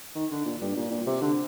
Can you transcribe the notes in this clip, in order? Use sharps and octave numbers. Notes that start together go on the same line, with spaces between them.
D#3
D3
A#2
G2
A#2
A#2
C3
D3